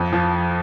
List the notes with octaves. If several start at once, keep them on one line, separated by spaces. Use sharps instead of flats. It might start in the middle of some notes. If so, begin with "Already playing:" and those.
Already playing: F2
F3